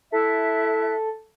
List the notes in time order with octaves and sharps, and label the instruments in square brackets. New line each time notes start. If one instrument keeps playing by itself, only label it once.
[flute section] E4 E5 F#6 [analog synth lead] A4